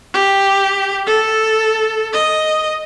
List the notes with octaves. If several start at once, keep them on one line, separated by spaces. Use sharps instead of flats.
G4
A4
D#5